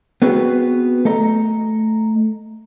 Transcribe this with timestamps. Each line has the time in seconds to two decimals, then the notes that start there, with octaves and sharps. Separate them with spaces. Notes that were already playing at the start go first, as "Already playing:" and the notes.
0.22 B3 C4 F#4 G#4 B4
1.05 A3 A4 D#5 A#5